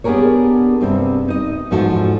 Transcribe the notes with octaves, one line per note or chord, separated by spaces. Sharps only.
B3 D4 G4 G#4 A#4 C#5
G2 C3 C4
D#4 D#5
E2 G#2 F3 F4 F#4 A4